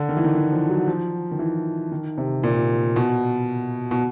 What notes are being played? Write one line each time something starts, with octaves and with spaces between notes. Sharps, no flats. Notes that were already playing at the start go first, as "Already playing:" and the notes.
Already playing: D3
D#3
E3
D#3
E3
F3
F#3
F3
D#3
E3
D#3
C3
A#2
B2
B2